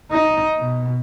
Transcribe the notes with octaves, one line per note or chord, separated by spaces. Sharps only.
D#4
B2